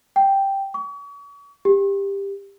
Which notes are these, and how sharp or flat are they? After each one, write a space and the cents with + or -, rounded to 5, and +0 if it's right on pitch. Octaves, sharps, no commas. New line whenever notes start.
G5 +0
C#6 +40
G4 +15